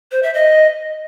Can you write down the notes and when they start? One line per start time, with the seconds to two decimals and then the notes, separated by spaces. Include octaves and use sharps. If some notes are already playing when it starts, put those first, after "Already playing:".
0.11 C5
0.23 E5
0.34 D#5